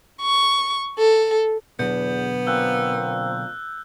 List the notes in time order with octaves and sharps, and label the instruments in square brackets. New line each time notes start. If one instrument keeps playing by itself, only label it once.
[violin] C#6
A4
[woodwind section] E2 [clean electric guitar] B2 D3 F#3 [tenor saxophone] B3 [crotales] G6
[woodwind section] A#2 A#3 C4 [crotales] E6 F#6